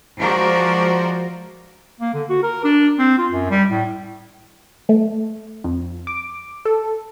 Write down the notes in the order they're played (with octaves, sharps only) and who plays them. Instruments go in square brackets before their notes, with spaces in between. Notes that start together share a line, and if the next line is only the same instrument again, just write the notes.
[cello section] F3 G#3 F#4 A#4 C5 D5
[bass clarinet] A#3
D3
F#4
A#4
D4
C4
F4
F#2
G3
A2
[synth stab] A3
F2
D6
A4